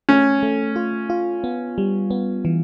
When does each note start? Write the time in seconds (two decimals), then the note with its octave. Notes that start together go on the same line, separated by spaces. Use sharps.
0.09 A3 C#4
0.43 A3
0.76 F4
1.10 F4
1.44 B3
1.78 G3
2.11 B3
2.45 E3